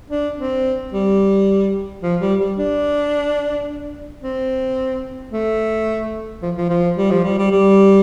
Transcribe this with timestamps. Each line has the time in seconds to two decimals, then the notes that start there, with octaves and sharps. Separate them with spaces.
0.11 D4
0.37 C4
0.93 G3
2.03 F3
2.21 G3
2.40 G3
2.58 D4
4.23 C4
5.33 A3
6.42 F3
6.58 F3
6.70 F3
6.98 G3
7.11 F3
7.25 G3
7.39 G3
7.52 G3